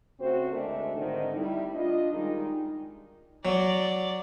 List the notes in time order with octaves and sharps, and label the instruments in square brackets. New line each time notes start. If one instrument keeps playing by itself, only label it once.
[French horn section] C#3 A3 C4 F#4 C5
D2 G#3 A3 D4 A4 A#4
G#2 D3 D#3 C4 D#4
G3 A3 E4
D4 F4 D#5
D#3 G3 G#3 D#4
[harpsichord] F#3 [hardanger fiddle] D5